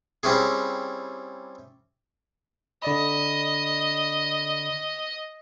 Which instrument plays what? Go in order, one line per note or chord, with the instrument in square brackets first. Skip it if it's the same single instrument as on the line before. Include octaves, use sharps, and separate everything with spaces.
[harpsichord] G3 C4 C#4 E4 G#4
[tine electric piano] D3 D5 B5 [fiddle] D#5